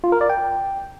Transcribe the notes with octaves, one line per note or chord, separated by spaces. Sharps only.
F4
A#4
D5
G5